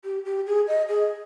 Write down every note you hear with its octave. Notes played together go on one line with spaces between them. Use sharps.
G4
G4
G#4
D#5
G#4